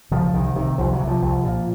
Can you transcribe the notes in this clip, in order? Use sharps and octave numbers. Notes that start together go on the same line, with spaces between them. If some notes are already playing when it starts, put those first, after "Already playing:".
C#3 F3
C2 D#3
C3 D#3
C2 F3
F#3
C3
F3
C2
A#2